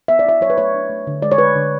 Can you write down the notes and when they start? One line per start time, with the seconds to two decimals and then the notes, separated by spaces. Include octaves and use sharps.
0.08 B3 E5
0.19 D5
0.25 E4 E5
0.41 F#3 C#5
0.50 B4
0.58 A3 C#5
0.75 D4
0.90 A3
1.07 D3
1.22 G#3 D5
1.31 C#5
1.38 G#3 B4
1.55 D3